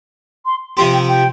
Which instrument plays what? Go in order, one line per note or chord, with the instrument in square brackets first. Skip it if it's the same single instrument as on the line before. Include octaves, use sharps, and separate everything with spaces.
[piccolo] C6
[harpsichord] C3 F3 C4 G4 [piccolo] C6
[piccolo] G5
G5